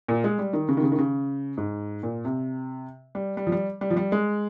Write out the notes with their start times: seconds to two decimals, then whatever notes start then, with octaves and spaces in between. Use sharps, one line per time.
0.08 A#2
0.24 G#3
0.39 G3
0.53 D#3
0.68 C#3
0.77 D#3
0.83 C#3
0.92 D#3
0.98 C#3
1.57 G#2
2.03 A#2
2.25 C3
3.15 G3
3.37 G3
3.47 F3
3.52 G3
3.81 G3
3.90 F3
3.97 G3
4.12 G#3